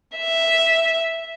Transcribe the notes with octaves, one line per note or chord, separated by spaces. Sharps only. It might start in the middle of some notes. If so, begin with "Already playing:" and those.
E5